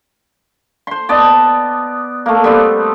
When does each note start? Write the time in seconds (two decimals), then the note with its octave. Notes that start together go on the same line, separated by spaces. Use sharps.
0.87 C5 C6
1.09 B3 D5 D#5 A5
2.26 A3 A#3
2.44 G3 B3 C4